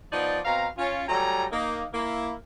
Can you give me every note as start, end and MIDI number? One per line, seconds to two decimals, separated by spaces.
0.12 0.39 53
0.12 0.39 59
0.12 0.39 63
0.12 0.39 74
0.45 0.66 47
0.45 0.66 60
0.45 0.66 77
0.45 0.66 82
0.76 1.06 61
0.76 1.06 65
1.07 1.44 54
1.07 1.44 55
1.07 1.44 57
1.07 1.44 80
1.07 1.44 82
1.51 1.85 58
1.51 1.85 63
1.93 2.33 58
1.93 2.33 64